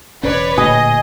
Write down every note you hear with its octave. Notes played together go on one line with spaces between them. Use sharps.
E1 C#3 C#4 B4 C#5 D5
D1 A#2 G#4 D#5